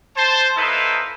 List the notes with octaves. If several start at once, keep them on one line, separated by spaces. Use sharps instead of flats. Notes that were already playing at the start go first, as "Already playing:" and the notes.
C5 A5
A#3 D#4 E4 A4 B4 C5